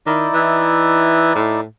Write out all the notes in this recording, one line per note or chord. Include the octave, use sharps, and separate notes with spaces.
D#3 D#4 E4 D5
E3
A2